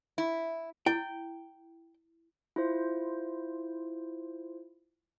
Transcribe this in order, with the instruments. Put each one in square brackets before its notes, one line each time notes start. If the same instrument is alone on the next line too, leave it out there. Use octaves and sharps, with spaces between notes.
[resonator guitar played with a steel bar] E4
[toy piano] E4 [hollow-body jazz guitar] G5
[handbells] E4 F4 C5